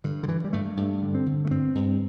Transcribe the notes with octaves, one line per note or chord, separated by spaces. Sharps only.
G2 D3
D3
G2 E3
G3
G2 A3
G2 A3
D3
C4
D3
A3
G2 C4
G2